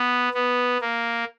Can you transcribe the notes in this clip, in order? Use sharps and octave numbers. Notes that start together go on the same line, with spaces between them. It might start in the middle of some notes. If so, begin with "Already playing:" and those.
Already playing: B3
B3
A#3